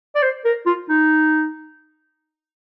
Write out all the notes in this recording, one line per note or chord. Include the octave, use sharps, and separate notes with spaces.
D5
C5
A#4
F4
D#4